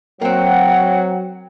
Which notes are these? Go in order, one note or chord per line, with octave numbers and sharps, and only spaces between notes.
F#3 A#3 C4 F#5 G5